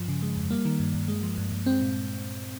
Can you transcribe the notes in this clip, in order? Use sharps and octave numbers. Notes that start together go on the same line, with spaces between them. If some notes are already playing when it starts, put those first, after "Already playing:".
Already playing: G2 F3
C#3
G#3
F2
G3 A#3
D#3
G2
G2
G#3
F3
G2
G2
G#3 C4
A#2